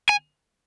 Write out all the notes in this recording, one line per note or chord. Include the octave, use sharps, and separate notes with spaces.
G#5